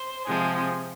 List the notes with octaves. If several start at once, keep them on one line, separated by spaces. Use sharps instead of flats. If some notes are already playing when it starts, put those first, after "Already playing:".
Already playing: C5
C3 F3 G#3 G#4